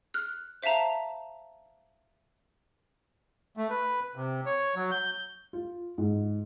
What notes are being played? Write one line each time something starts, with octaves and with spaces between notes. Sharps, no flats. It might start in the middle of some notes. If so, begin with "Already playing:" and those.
F6 F#6
C5 E5 F5 A5 A#5
A3
B4
C3
C#5
F#3
G6
F4
G#2